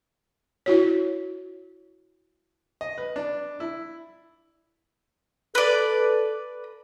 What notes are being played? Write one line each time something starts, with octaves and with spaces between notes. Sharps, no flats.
E4 F#4 C#5
D#5
B4
D4
E4
A4 B4 D5